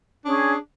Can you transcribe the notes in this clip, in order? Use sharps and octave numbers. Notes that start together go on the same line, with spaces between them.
C#4 D4 G#4 C#5